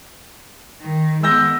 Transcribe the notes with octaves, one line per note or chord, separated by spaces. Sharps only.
D#3
G#3 B3 E6 G6 A#6